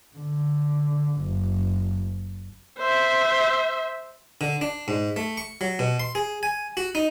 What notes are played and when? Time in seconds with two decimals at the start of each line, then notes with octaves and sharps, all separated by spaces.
0.17 D3
1.21 F#1
2.79 C5 E5
4.41 D3
4.61 D4
4.88 G#2
5.16 A3
5.37 C#6
5.61 F#3
5.79 B2
6.00 C6
6.15 G#4
6.43 G#5
6.77 F#4
6.95 D#4